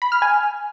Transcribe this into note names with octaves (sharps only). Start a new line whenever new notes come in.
B5
F6
G#5